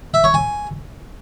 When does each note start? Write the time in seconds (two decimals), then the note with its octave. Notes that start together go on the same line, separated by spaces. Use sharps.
0.14 E5
0.24 C#5
0.34 G#5